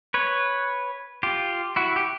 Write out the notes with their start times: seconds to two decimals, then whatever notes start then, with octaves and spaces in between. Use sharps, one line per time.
0.14 B4 C#5
1.23 F4 G4
1.76 E4 F#4
1.96 G4